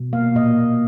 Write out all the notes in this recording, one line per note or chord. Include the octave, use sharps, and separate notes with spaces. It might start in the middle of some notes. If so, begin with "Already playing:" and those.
Already playing: B2
A#3 F5
A#2 D#5